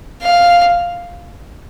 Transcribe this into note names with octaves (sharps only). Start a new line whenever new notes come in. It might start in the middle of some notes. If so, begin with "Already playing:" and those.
F5